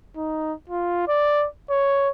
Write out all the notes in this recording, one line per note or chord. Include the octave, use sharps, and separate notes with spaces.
D#4
F4
D5
C#5